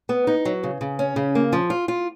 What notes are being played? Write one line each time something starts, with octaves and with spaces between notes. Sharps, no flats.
B3
D#4
F#3
C#3
C#3
C#4
C#3
A#3
F3
F4
F4